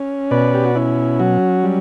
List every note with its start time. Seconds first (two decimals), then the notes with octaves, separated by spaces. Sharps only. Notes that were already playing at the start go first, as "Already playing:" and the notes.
Already playing: C#4
0.31 B2 B4 D5
0.54 G4
0.65 F#4
0.75 C#4 E4
1.19 F#3 F#4
1.64 G3